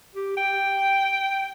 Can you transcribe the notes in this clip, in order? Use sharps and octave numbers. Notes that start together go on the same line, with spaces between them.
G4
G5